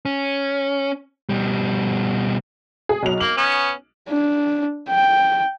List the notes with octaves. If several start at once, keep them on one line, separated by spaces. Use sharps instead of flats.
C#4
B2 G3
G#4
B1 F#3 F7
A#3 F#7
B3 C#4
D4
G5